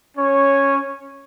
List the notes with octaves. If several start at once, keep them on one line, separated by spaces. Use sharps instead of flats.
C#4 C#5